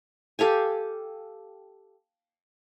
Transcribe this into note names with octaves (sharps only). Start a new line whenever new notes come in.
G4 A4 F5 G#5